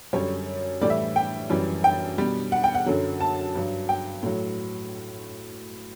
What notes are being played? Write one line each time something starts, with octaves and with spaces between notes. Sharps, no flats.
F#2 D3 G3 C#5
A2 E3 G3 D5
E5
G5
F#2 E3 G3
G5
B2 G3
F#5
G5
F#5
F#2 D3 F#3
A5
G2 F#3
G5
A2 F#3